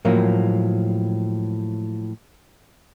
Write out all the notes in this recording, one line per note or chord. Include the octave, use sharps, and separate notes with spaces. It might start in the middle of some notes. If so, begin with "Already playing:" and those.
A2 F3 F#3 A#3